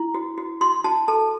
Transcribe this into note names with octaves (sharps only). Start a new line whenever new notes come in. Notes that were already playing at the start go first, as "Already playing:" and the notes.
Already playing: E4
F#4
F#4
F#4 C6
F#4 A5
A4 A5